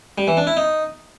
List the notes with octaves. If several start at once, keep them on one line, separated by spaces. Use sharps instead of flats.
G3
E3
D4
E4
D#4